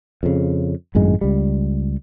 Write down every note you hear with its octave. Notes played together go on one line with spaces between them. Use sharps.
F2 C#3
G#1 F#2 A2 G#3
C#2 G3